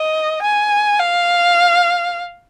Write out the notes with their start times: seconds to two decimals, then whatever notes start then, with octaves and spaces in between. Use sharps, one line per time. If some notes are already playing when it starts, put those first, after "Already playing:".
Already playing: D#5
0.42 G#5
1.00 F5